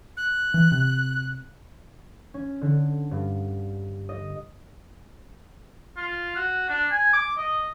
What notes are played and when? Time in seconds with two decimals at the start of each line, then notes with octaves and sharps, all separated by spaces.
0.17 F#6
0.54 E3
0.72 C3
2.34 C#4
2.61 D3
3.11 G2
4.09 D#5
5.97 F4
6.36 F#4
6.69 D4
6.91 G#5
7.13 D6
7.37 D#5